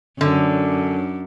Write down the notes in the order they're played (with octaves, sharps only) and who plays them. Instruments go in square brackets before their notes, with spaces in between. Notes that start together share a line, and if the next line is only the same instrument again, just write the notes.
[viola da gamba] F#2 [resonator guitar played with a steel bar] D3